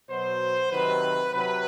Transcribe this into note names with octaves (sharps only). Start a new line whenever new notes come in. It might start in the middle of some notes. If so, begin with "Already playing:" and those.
B2 F#3 C5
C3 D#3 F#3 B4
C3 F#3 B4